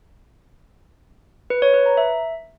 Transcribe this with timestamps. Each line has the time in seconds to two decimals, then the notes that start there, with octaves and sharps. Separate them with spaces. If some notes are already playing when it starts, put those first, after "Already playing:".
1.50 B4
1.62 C#5
1.74 B4
1.86 A#5
1.97 E5